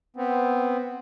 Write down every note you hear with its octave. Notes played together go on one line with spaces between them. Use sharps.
B3 C4